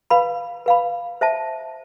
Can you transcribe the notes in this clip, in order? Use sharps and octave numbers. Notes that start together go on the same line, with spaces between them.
B4 F5 B5
B4 F5 B5
C5 E5 A5